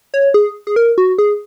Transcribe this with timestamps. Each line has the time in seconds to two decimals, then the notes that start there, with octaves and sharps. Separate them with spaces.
0.14 C#5
0.34 G#4
0.67 G#4
0.76 A#4
0.98 F#4
1.18 G#4